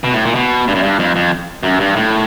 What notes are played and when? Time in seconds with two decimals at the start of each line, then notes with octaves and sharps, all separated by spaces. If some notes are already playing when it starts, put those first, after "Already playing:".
0.04 B2
0.14 A2
0.25 A#2
0.35 B2
0.68 G2
0.75 F#2
0.83 G2
0.99 F2
1.16 F2
1.63 F#2
1.80 G2
1.96 A2